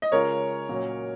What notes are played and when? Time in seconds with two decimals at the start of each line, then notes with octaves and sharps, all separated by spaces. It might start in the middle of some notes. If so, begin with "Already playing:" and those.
0.02 D#5
0.12 C#3 G#3 C#4 F4 A#4 C#5
0.69 A#2 F#3 C#4